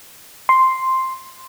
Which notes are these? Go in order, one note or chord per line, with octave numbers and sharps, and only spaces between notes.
C6